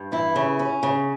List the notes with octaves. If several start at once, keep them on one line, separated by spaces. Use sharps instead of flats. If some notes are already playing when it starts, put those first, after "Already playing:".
Already playing: G2
E3 E4
C#3
C#4
C#3